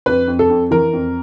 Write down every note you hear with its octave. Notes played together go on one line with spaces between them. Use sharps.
F2 B4
F2
A4
F2
E3 A#4
F2